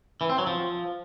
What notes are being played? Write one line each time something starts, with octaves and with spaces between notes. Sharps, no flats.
E3
C4
F#3
F3